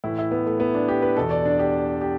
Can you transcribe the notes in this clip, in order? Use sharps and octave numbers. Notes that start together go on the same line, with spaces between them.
A2 E3 E4
E4
B3
A3
B3
D4
G4
B4
E2 B2 A4
D5
D4
G4
G4